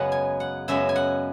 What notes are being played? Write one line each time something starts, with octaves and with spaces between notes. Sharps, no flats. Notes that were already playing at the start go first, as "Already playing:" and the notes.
Already playing: F#2 C#3 G#3 B3 F#5
G#5
F#5
F#2 C#3 G#3 B3 E5
G#5
F#5